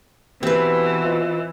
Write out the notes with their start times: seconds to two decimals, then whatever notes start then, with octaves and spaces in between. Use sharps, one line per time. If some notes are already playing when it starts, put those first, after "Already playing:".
0.43 B2 E3 C4 G4 B4
1.04 F4 C5 D#5